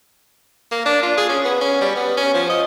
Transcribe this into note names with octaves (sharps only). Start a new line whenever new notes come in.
A#3
D4
F4
G#4
C#4
B3
C#4
G3
B3
C#4
F3
D#5